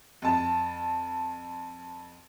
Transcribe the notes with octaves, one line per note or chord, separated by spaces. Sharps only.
F2 A5